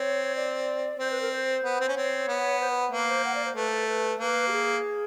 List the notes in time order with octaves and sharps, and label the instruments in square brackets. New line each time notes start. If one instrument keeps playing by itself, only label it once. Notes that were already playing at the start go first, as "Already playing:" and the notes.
Already playing: [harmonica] C4 [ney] C#5
[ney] D5
[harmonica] C4 [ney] C5
[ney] B4
A#4
C5
[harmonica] B3
C4
C#4
[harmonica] C4 [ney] C#5
[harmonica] B3
[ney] C5
B4
[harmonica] A#3 [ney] B4
[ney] C5
F#5
D5
C5
[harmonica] A3 [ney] B4
[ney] B4
B4
[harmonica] A#3 [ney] B4
[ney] G4
G#4